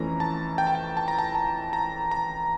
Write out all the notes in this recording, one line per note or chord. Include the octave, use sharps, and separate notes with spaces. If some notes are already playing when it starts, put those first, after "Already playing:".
Already playing: F2 E3 A3 C#4 A#5
A5
G5
A5
G5
A5
A#5
A5
A5
A#5
A#5